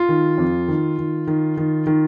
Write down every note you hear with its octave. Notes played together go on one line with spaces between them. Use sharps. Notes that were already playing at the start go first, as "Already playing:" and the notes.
Already playing: F4
D#3
F2
D#3
D#3
D#3
D#3
D#3